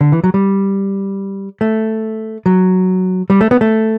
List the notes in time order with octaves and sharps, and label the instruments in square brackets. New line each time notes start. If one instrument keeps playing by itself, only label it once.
[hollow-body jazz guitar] D3
E3
F#3
G3
A3
F#3
G3
A3
B3
A3